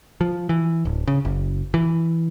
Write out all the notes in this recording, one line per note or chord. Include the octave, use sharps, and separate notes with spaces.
F3
E3
D1
C#3
F#1
E3